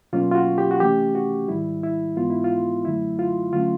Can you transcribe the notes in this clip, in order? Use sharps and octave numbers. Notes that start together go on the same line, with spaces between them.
B2 F#3 A#3 C#4 F4
F4
F#4
G4
F#4
C3 E3 A3 C#4 G4
F#4
G#2 D#3 G3 E4
E4
G#2 E3 G#3 B3 F4
E4
F4
F#2 D3 F#3 A3 E4
F4
D3 F#3 A3 C#4 F4